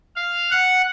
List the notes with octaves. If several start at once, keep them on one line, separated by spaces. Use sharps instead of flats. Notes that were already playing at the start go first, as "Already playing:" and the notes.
F5
F#5